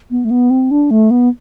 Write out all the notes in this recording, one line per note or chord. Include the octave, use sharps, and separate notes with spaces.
B3
A3
B3
C4
D4
A3
B3